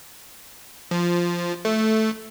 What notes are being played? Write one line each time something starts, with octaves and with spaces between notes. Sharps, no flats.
F3
A3